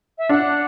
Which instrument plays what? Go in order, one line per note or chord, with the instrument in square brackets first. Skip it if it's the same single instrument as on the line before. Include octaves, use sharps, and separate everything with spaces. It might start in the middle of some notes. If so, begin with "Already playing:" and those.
[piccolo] E5
[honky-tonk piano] D4 [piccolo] F#5